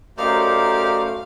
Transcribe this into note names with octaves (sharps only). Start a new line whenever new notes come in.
F#2 A3 D#4 G4 A#4 C5 D5 F5